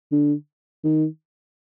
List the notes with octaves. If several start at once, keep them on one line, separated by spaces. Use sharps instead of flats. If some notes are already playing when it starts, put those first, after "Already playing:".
D3
D#3